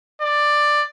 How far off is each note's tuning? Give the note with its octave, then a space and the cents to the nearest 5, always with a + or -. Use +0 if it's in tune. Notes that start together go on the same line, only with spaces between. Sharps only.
D5 +10